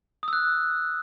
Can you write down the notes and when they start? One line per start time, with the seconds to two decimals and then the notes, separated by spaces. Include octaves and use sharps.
0.23 D#6
0.28 E6
0.33 F#6